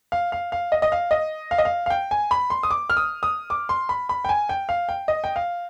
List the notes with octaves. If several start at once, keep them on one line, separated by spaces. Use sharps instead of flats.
F5
F5
F5
D#5
D#5
F5
D#5
F5
D#5
F5
F5
G5
G#5
B5
C6
D#6
D6
F6
D#6
D#6
D6
C6
B5
B5
G5
G#5
G5
F5
G5
D#5
G5
F5